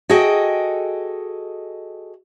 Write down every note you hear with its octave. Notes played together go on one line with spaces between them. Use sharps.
F#4 G#4 A4 D#5 G5